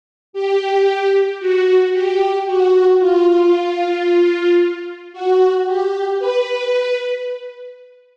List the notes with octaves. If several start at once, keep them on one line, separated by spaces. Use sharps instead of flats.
G4
F#4
G4
F#4
F4
F#4
G4
B4